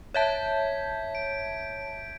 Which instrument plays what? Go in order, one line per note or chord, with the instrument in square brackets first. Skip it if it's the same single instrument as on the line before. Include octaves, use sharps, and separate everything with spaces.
[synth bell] C#5 E5 A5 [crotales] G6 G#6 B6
[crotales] D7